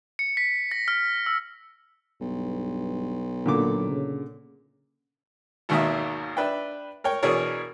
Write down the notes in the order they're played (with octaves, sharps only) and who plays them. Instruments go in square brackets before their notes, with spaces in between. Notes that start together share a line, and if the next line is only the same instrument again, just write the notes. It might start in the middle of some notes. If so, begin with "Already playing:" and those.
[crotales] C#7
B6
A#6
F6
E6
[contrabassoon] B1 [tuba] G2
[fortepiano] A#2 D3 D6 [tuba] F#3
[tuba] C#3
[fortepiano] G#1 D#2 B2 D#3 A#3 E5
D4 B4 E5 G5
A#4 C#5 G5
B2 E3 D4 G#4 A#4 C#5